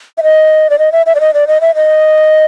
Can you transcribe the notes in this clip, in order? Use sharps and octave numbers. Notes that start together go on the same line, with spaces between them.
E5
D#5
D5
D#5
E5
E5
D5
D#5
D5
D#5
E5
D#5